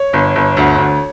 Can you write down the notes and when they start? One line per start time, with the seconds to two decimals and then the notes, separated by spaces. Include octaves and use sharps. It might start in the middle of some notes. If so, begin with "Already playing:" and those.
Already playing: C#5
0.13 G1
0.35 G1
0.57 D2
0.78 D2